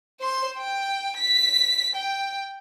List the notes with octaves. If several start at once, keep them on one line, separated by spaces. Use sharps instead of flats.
C5 C6
G5
B6
G5